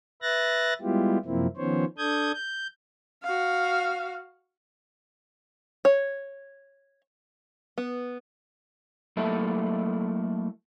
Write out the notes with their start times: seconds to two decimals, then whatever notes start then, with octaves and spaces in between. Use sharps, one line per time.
0.22 B4 E5 F#6 A6 A#6
0.81 G3 G#3 B3 E4 F4 G4
1.25 F#2 C3 F3 A#3 C4 E4
1.57 D#3 F3 B3 C#4 C5 C#5
1.98 D4 A4 D#6 G6 G#6
2.34 G6
3.23 F#4 F5
5.85 C#5
7.78 B3
9.17 F#3 A3 A#3 E4 A4 E5